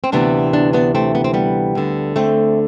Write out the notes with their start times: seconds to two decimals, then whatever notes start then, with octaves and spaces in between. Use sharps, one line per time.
0.04 C4
0.12 D2 C3 E3 B3 D4
0.53 B3 D4
0.73 B3 D4
0.95 A3 C4
1.15 B3
1.24 C4
1.34 G3 B3
1.75 D2 D3
2.16 A3 C4